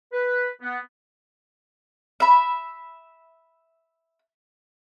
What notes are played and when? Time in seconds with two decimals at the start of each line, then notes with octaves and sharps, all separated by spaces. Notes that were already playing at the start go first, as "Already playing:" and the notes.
0.13 B4
0.61 B3
2.20 E5 B5